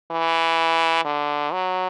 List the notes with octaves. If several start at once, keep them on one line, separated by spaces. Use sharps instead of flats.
E3
D3
F#3